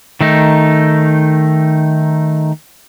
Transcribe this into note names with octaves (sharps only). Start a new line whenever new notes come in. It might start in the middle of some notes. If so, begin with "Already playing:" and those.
D#3 A3 D#4